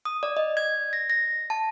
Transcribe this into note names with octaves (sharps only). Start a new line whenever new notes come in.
D#6
D5
D#5
G#6
A#6
A#6
A5